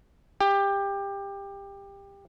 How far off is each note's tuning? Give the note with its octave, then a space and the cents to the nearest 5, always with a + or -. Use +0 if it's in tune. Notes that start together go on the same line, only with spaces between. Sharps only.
G4 +20